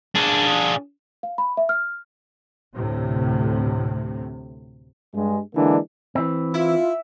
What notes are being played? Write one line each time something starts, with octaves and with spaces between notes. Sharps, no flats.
D4 G#4
F5
B5
E5
F6
D2 A2 C3
G2 G#3
D3 E3 G#3 A#3 D4
E3 C4
E4 F4